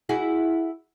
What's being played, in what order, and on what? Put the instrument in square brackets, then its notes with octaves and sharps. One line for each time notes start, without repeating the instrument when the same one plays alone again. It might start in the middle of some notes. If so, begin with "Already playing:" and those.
[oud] E4 F#4 G#4